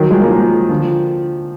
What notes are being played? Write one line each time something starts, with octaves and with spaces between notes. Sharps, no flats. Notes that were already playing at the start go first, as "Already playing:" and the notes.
Already playing: D#3 F#3
F3 G#3
A#3
F3 G#3
D3 F3